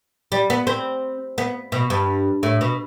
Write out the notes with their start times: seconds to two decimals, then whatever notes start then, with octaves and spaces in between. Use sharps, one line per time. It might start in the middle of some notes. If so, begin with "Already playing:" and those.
0.32 G3
0.50 B3
0.67 C4
1.38 B3
1.72 B2
1.90 G2
2.43 A2
2.61 B2